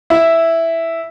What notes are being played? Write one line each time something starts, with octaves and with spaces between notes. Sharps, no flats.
E4